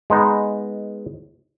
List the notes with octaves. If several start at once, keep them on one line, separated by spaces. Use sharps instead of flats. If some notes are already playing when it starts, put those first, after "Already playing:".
G#3 B3 D#4